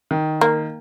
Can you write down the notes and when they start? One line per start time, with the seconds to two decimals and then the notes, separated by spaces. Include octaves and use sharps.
0.11 D#3
0.41 A#3